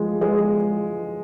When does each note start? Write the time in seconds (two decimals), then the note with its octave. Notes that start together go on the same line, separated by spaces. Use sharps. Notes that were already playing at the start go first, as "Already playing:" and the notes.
Already playing: F3 G#3
0.21 G#3